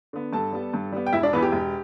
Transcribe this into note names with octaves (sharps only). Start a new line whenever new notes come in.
D3 B3
G2 A4 A5
G3 B3
G2
G3 B3
G5
E1 E4 E5
D4 D5
E2 E3 B3 B4
G4
E1